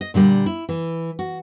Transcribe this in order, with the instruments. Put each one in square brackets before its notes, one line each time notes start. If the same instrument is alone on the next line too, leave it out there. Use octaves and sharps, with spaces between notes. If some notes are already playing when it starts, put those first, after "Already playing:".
[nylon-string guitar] D#5
A#2 D3 G3 A#3
E4
E3
F#4